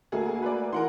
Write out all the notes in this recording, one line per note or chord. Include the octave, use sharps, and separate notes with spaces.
D2 A#3 G#4 A4 G#5
B4 D5
E3 A#4 F#5 C6